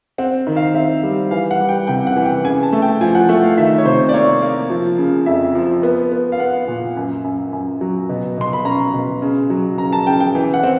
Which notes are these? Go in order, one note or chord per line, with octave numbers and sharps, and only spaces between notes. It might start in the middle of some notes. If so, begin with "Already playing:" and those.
C4 F#5
D#3
F5
C4 E5
G3
E3 F5
F#5
G3
G5
C3 G5
F#5
E3
G5
C#3 G#5
A5
A3
G5
F3 G#5
F#5
A3 F#5
F5
D#3 E5
C#5
C3 C5
D5
A#3 C#5
A#3
F3
C#3
F2 E5
F3
B3
B3
F5
B3 F#5
A#2
F#2
F#2
F#2
F#3
B2
B2 C6
B5
C#4 A#5
B2
C#3
F#3
C#3 A#5
A5
C#3 G5
G5
E3 G5
F#5
C4